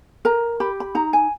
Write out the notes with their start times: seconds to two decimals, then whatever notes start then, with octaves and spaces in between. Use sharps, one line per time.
0.25 A#4 A#5
0.60 G4 B5
0.80 B5
0.95 D#4 A#5
1.13 G#5